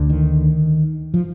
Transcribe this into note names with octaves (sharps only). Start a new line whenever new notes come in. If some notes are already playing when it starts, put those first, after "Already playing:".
Already playing: D2 D3
D#3
F3